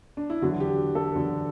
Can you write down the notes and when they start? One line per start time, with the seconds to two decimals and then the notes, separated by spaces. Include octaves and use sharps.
0.17 D4
0.30 E4
0.42 E2 D3 F#3 F#4
0.60 G4
0.95 A4
1.14 E2 D3 F#3